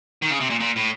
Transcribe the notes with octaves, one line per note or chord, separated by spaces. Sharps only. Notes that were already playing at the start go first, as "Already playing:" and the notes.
D#3
C#3
C3
A#2
A#2
A2